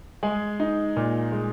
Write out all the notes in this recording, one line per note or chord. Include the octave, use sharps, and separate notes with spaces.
G#3 G#4 G#5
D#4
A#2
G#3